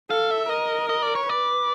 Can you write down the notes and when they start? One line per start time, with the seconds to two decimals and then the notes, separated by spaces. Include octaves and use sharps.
0.10 A4 F5
0.31 E5
0.49 A#4 D#5
0.89 D#5
1.02 D5
1.15 C#5
1.28 B4 D5